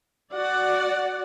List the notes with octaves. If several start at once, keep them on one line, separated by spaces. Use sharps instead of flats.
F#4 D5 F#5